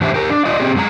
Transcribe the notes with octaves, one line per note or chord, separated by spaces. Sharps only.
A2 E3 D4 G4 C5 E5
G4 A#4
D4
F4 D5 D#5
C4 G4 G#4
F#2 G#3 F#4 A#5